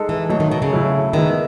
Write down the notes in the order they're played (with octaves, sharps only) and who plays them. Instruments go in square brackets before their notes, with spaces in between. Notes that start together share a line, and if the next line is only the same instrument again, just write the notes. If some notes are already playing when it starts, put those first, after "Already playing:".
Already playing: [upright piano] G#3 D#4 A4
[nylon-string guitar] E3
[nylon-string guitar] E3 [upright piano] F#3 A3 D#4
[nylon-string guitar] D#3
B2
C#3
[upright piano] A2 F#3 A3 C#4 E4
[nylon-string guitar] D#3 [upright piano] G#3 B3 E4